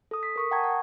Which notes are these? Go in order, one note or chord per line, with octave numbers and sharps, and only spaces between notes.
A4 D#6
B6
A#4 C#6 D#6
F#5 G5 A5 A#5 C#6 G#6
F#5